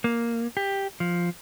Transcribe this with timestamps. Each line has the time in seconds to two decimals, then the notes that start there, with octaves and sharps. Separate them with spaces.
0.04 A#3
0.57 G4
1.00 F3